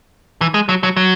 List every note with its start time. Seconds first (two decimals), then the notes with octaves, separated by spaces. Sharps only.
0.41 E3
0.54 G#3
0.69 F#3
0.83 F#3
0.97 F#3